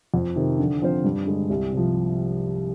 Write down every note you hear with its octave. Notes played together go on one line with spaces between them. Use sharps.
F2
C3 D#3
D3
F3 C4 F4 C5
G2
D3 G#3
C2
C3 F3